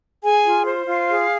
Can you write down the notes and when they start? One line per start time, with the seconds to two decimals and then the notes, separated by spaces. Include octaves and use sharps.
0.23 G#4 G#5
0.44 F4
0.66 C5
0.86 F4 F5
1.08 G#4